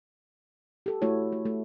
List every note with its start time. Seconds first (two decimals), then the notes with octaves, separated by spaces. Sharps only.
0.86 G4 A4
1.02 A3 E4 F#4 C#5
1.33 A3
1.45 A3